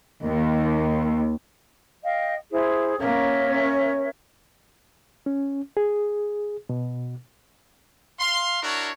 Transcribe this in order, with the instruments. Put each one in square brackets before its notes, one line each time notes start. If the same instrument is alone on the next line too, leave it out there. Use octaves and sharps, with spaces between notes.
[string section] D#2
[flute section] D#5 F5 G5
E4 G#4 C5
[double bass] A#3 C#4 [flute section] A#4 C#5 E5
[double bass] C#4
[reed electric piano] C#4
G#4
B2
[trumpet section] F5 C6
D4 E4 F#4 A#4 C#5